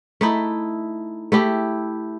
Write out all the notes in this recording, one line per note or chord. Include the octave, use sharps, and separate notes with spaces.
A3 D#4 E4
A3 E4 G4